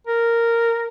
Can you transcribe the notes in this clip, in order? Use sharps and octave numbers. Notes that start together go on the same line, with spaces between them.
A#4